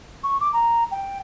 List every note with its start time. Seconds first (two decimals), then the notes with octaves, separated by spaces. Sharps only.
0.24 C#6
0.40 D6
0.53 A#5
0.91 G5